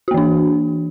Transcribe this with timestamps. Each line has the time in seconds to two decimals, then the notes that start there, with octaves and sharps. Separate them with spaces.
0.08 F#4
0.11 A#3
0.14 E3
0.18 D4